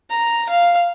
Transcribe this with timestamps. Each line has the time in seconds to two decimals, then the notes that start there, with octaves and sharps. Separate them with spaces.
0.10 A#5
0.50 F5